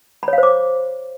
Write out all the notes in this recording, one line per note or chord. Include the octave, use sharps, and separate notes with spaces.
B5
C#5
F5
C5
D6